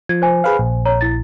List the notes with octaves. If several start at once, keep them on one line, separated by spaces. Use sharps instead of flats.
F3 G#6
C5 G#5
G#4 B4 F5
A#1
C#5 A#5
E4 A6